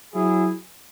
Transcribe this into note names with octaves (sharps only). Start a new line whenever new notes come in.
F#3 E4 G#4